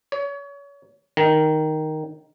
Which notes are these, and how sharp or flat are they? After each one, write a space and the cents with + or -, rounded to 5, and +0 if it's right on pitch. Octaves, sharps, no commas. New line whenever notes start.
C#5 +30
D#3 +0